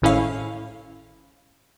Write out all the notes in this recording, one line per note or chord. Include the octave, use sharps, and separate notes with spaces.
G#1 A2 C#4 E4 F5